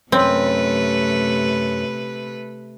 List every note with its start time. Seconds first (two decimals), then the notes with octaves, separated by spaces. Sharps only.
0.12 F#2 C3 A3 C4 B4